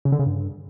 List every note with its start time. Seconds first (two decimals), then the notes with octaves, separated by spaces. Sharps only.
0.05 C#3
0.12 D3
0.19 C#3
0.26 G2